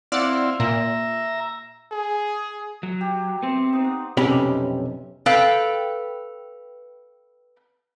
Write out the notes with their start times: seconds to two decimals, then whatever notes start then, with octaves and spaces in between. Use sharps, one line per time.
0.12 C4 E4 D5 F5 F#5
0.60 A#2 E5 A#5
1.92 G#4
2.83 F#3
3.01 G4
3.42 B3 C4 C5 E5
3.73 D#4 C5
3.84 F#5
4.17 B1 F2 C3 C#4 G4 B5
5.26 A4 B4 F5 G5